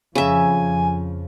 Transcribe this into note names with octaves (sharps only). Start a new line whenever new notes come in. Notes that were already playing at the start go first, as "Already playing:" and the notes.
F2 C#3 F3 E5 G#5